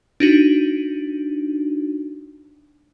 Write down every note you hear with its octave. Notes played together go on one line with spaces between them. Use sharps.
D4 D#4 F#4